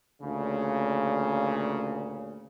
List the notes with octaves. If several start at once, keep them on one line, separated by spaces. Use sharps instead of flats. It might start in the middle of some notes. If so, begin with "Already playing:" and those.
D2 A#2 C#3